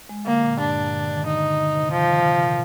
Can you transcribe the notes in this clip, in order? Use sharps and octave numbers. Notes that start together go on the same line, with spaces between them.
G#3
D3 A#3
A#2
G2 D4
A#2
D3
D#3
D3 D#4
D3
D3
C3
D#3 F3
D#3
C3
A#2